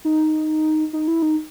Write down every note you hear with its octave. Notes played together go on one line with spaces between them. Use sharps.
D#4
D#4
E4
D#4